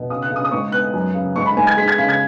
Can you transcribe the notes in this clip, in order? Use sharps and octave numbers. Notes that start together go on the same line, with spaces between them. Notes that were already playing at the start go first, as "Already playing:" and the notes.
Already playing: B2
C#3 D#6
F#6
C#3 D#6
D#6
G#2 C#6
B3 F#6
F#2
C#3
G#2 C#6
B5
G#2 G#5
G#6
G#3 B6
G#6
C#3 B6
G#6